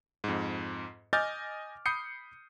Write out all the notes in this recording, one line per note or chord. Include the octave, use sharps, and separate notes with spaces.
F2 G#2
D#5 G#5 D6 F6 G6 A6
B5 D#6 G6 C7 C#7